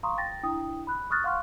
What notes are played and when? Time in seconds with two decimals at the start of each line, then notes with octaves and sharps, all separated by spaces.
0.03 F5 A#5 C6 C#6 D#6
0.18 G5 A#5 A6 A#6
0.43 D4 E4 G5 D#6
0.87 B5 F#6
1.10 C#6 D#6 F6 F#6 A6
1.24 F5 F#5 C6 C#6 F6 F#6